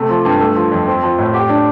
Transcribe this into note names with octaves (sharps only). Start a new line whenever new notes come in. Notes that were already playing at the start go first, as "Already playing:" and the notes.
Already playing: C3 A3
F3
G2
A3
F3
F2
C4
F3
A2
G4
D4